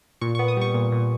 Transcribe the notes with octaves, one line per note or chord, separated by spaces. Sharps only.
A#2 C#6
B3 C#6
D#6
G3 C#6
A#2
A#2